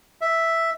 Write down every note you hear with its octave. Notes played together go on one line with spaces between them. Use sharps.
E5